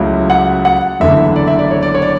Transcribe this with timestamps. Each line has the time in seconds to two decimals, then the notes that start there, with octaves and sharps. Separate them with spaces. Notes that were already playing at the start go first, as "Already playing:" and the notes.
Already playing: C#2 C#3 F#3 A3 E4
0.30 F#5
0.65 F#5
1.00 F#1 E2 D3 A3 E5
1.36 D5
1.48 E5
1.59 D5
1.71 C#5
1.83 D5
1.94 C#5
2.02 D5